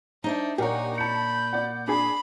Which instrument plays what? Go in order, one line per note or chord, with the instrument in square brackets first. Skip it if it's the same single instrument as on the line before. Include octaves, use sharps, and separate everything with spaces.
[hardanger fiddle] D4 [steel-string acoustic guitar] D#4 C5 E5
[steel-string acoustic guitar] A#2 C#5 [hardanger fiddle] D#4 G#5 [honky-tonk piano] G4 A#4 F#5
[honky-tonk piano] A5 C#7 [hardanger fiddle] B5 [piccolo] G6
[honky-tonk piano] D5 F#5
[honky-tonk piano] D4 G#4 [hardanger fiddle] B5